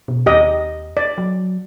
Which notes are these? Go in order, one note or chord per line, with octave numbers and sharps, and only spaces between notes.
B2
D#2 G4 D#5
D5
F#3